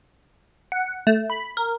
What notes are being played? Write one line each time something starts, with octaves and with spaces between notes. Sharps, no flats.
F#5
A3
B5
A#4